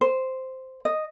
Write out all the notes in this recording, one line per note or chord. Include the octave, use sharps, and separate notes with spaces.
C5
D#5